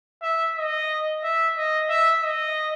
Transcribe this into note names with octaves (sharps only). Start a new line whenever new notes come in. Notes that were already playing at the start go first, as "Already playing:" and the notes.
E5
D#5
E5
D#5
E5
D#5